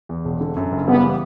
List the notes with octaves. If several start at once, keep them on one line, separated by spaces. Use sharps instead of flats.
E2
E1
D3
F#2
F#1
G3 B3
E3